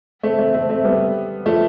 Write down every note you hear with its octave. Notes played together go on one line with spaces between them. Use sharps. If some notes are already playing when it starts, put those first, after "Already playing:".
A3 C4
A3 C4
A3 C4
A3 C4
G3 B3
F3 A3